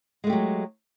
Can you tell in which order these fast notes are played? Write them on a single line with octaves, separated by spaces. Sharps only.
G#3 A3 G4 F#3